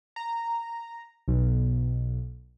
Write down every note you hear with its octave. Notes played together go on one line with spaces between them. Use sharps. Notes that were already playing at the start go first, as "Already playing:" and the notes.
A#5
B1